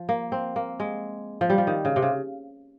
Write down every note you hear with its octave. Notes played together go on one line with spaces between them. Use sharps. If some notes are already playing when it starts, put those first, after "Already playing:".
Already playing: F3
A#3
C4
A#3
G#3
F3
G3
F3
D#3
C#3
C3
C#3